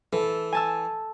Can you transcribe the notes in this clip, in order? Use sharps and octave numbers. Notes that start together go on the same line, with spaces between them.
E3 A4
G#5 A5 E6